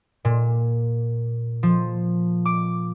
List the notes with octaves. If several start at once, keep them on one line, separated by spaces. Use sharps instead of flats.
A#2
F3
D6